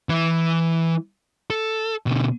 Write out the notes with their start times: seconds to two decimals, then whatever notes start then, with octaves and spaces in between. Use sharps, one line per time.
0.09 E3 E4
1.50 A4
2.07 B2 D3